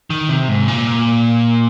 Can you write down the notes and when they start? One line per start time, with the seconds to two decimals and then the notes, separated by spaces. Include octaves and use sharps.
0.10 D#3
0.29 C3
0.48 G#2
0.68 A#2